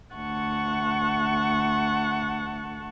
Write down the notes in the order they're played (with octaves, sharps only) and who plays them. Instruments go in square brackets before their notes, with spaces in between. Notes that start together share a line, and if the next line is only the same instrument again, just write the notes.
[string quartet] D2 F#5 A5 C#6